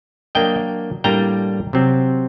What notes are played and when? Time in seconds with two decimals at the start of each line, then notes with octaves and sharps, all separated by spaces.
0.35 F#3 A#3 D4 D#5 G5
1.04 A2 G3 A#3 D4 G5 A#5
1.73 C3 F#3 C4